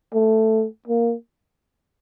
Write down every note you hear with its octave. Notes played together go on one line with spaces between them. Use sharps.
A3
A#3